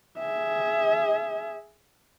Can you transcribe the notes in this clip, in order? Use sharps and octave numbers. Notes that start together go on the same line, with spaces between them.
G#4 E5